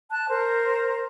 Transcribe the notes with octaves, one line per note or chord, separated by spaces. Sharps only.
A5 F#6
A#4 C5